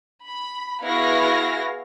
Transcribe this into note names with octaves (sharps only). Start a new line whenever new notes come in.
B5
B3 E4 F#4 G#4 F5 A#6